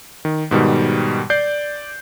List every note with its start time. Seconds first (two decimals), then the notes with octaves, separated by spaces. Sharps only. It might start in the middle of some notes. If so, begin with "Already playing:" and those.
0.25 D#3
0.51 G#2 B2 D#3 G3
1.30 D5 G6 C7